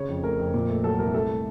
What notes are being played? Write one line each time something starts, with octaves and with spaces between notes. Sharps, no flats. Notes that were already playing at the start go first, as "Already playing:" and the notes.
Already playing: C#3 C#5
F2
A3 A#4
F2
A#2
A3
F#3 A4
C2 A#4
A3 A4
A3